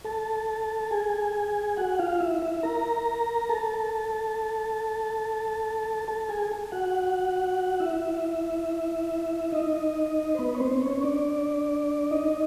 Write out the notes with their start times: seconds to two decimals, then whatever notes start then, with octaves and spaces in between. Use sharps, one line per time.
0.05 A4 A5
0.91 G#4 G#5
1.77 F#4 F#5
1.99 F4 F5
2.20 E4 E5
2.42 E4 E5
2.63 A#4 A#5
3.49 A4 A5
6.08 A4 A5
6.29 G#4 G#5
6.72 F#4 F#5
7.80 E4 E5
9.52 D#4 D#5
10.35 C5
10.39 B3 B4
10.55 C#5
10.60 C4 C5
10.82 C#4 C#5
11.03 D4 D5
12.11 D#4 D#5